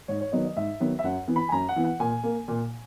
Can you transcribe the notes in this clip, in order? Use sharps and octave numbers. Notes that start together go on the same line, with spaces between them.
G#2 C#5
C#5
D#3 F#3 B3 D#5
D#5
G#2 E5
D#3 F#3 B3
E5
F#2 F#5
E3 B3
B5
G#5
F#2 A#5
F#5
E3 B3
F#5
A#2 G#5
A#3
A#2